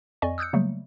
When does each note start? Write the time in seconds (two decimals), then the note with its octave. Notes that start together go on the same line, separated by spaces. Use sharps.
0.22 F2 D5 D#5 G#5 C#6
0.38 D#6 E6 F#6 G6 C#7
0.53 C#3 F#3 G3 A3 A#3